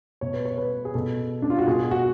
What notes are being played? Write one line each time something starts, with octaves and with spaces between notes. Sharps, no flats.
B2 C#5
B4
C#5
B4
G#4
B2 A4
D4
F4
F#4
B2 G#4
G#4
F#4